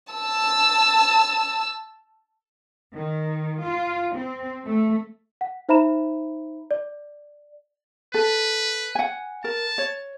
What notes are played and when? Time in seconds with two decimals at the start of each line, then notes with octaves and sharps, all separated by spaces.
0.13 A5 E6
2.94 D#3
3.64 F4
4.14 C4
4.65 A3
5.41 F#5
5.69 D#4 C5 E5 A#5 B5 E7
6.71 D5
8.14 A4 B4
8.95 F#5 G#5
9.44 A#4 A5
9.78 C#5